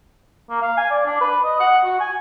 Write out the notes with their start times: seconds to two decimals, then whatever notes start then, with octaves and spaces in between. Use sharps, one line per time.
0.50 A#3
0.62 F5
0.78 G#5
0.91 D5
1.06 D4
1.21 B4
1.44 D#5
1.60 F#5
1.85 F#4
2.00 G#5